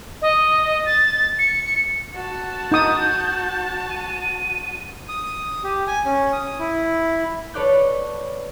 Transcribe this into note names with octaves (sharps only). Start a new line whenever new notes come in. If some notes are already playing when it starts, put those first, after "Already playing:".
D#5
A6
C#7
F#4 A5
D#4 D#6 G6
D#7
D#6
G4
G#5
C#4
D#6
E4
A4 B4 C#5 D5 F#6 G6